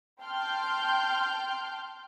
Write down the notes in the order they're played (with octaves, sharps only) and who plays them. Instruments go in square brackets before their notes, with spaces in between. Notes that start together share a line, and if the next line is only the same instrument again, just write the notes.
[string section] G5 A5 C6 F6 G6